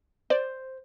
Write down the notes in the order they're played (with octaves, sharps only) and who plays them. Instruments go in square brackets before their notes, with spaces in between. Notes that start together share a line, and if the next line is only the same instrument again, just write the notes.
[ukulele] C5 [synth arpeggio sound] D5